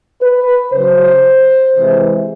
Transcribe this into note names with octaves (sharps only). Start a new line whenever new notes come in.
B4
C#3 F#3 C5
C3 E3 G#3